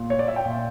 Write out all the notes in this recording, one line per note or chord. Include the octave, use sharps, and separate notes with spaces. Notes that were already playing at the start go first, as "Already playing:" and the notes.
Already playing: A#2
C#5
D5
E5
G5
A#2